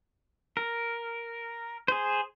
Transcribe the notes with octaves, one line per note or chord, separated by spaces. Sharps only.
A#4
G#4 C5